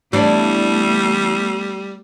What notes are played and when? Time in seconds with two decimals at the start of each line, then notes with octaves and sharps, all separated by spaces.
0.13 E3 G3 A3 B3 D4